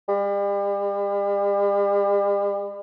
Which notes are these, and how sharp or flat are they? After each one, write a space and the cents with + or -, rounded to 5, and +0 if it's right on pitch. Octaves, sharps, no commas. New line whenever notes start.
G3 +40